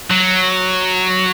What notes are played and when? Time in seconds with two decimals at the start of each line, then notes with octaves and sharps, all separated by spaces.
0.10 F#3